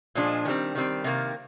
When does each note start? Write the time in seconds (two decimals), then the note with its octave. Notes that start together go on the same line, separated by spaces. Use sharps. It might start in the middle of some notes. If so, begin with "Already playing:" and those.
0.15 A#2 F3 G#3 D4
0.45 D#3 G3 C4
0.75 D#3 G3 C4
1.04 C3 D#3 A#3